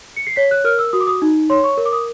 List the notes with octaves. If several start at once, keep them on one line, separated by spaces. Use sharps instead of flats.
C#7
C7
C#5 B6
F#6
A#4 F6
E6
F#4 D#6
D6
D#6
D#4
C#5 C6
C#6
A#4
D6
D#6